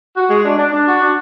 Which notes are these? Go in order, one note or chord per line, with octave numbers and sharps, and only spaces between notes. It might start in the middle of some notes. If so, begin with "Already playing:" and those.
F#4
G#3
D4
D4
D4
F#4
D4